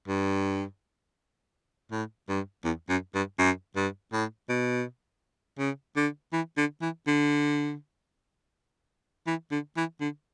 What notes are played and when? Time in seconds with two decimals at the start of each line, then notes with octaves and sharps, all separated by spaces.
0.08 G2
1.91 A2
2.29 G2
2.65 E2
2.89 F#2
3.15 G2
3.39 F#2
3.76 G2
4.13 A2
4.49 B2
5.59 C#3
5.96 D3
6.33 E3
6.57 D3
6.82 E3
7.07 D3
9.27 E3
9.51 D3
9.77 E3
10.01 D3